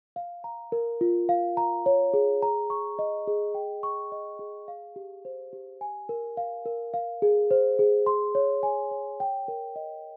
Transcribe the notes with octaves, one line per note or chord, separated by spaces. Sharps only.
F5
A#5
A#4
F4
F5
A#5
C#5
G#4
A#5
C#6
D#5
G#4
G5
C#6
D#5
G#4
F5
G4
C5
G4
G#5
A#4
F5
A#4
F5
G#4
C5
G#4
C6
C#5
G#5
C#5
G5
A#4
D#5